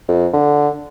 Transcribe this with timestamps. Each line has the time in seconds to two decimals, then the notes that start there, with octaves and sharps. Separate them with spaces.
0.08 F2
0.33 D3